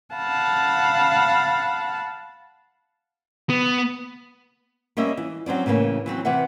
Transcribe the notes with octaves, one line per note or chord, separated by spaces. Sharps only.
F5 F#5 A5 B5
B3
G3 A#3 C#4 D#5 E5
E3
F#3 C4 C#4 D5
A2 C#3 E3 A#3 C#4
E3 F#3 C4 C#4
C3 E3 B4 E5 F#5